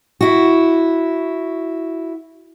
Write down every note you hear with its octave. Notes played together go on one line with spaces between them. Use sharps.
E4 F#4